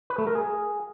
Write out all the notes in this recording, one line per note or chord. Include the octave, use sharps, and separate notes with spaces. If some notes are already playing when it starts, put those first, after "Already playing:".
B4
A3
A#4
G#4